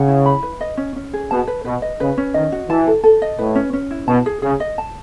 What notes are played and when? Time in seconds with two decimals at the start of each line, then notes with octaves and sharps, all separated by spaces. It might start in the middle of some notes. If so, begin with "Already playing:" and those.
Already playing: C#3 F#5
0.08 E4
0.26 B5
0.43 B4
0.61 D#5
0.77 C#4
0.96 C#4
1.13 G#4
1.31 B2 A5
1.47 B4
1.65 B2 B4
1.82 D#5
2.00 C#3 B4
2.18 C#4
2.34 D#3 D#5
2.52 F#4
2.69 E3 A5
2.87 A4
3.04 A4
3.22 D#5
3.39 A2 B4
3.55 C#4
3.73 C#4
3.91 E4
4.07 B2 A5
4.26 G#4
4.42 C#3 G#4
4.60 D#5
4.78 A5